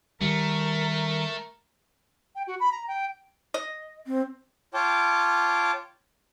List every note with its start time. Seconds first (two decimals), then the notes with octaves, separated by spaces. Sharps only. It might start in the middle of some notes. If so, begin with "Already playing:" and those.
0.21 D#3 G3 A3 A#4
2.36 G5
2.47 F#4
2.60 B5
2.72 A#5
2.88 G5
3.54 D#5
4.07 C4
4.74 F4 C#5 G5 A5 D6